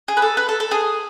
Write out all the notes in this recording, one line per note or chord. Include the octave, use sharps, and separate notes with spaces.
G#4
B4
A4
B4
A4
A4
G#4